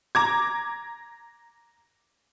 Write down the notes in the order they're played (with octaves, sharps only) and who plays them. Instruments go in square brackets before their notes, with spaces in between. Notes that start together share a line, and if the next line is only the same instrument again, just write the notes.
[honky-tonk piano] A#5 D6 G#6